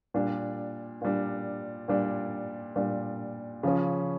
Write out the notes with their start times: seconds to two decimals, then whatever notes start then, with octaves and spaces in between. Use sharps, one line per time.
0.14 A#2 G3 D4
1.02 A#2 G3 D4
1.88 A#2 G3 D4
2.76 A#2 G3 D4
3.63 C#3 F3 C#4